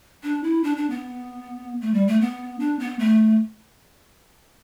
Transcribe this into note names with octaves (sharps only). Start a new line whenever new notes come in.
D4
E4
D4
D4
B3
A3
G3
A3
B3
D4
B3
A3